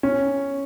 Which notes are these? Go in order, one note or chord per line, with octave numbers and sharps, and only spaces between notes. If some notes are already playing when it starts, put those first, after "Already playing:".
C#4